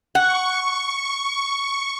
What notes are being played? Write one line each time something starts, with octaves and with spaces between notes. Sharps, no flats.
F#5 C#6